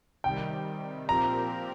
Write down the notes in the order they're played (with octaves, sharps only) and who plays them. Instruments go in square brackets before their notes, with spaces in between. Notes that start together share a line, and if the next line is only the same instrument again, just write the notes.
[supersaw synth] C3 D#3 G3 [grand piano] G5
[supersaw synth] A#2 F3 C4 G4 A#4 [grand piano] A#5